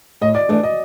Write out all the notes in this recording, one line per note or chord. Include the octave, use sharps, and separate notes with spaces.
A2 D#5
D5
E3 A3 D4 D5
D#5